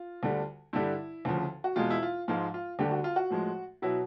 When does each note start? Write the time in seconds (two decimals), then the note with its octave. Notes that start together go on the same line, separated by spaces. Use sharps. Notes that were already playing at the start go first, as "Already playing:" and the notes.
Already playing: F4
0.23 D2 D3 G3
0.73 G2 D3 G3 E4
1.25 D2 C#3 F3
1.64 F#4
1.76 E2 B2 G#3 F4
1.91 E4
2.02 F4
2.28 G#2 F3 G#3 F4
2.54 F4
2.79 D2 D3 G3 G4
2.91 F#4
3.04 F4
3.16 F#4
3.30 A2 F3 G#3
3.82 B2 F#3 E4